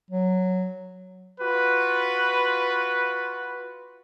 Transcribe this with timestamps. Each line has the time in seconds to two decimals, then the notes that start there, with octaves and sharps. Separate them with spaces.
0.10 F#3
1.41 F4 F#4 B4